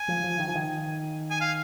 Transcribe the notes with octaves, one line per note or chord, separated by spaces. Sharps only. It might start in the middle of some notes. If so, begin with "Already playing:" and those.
Already playing: G#5
F3
F3
D#3
F3
D#3
G#5
F5